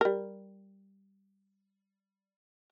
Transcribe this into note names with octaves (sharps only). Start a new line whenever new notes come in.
G3 A#4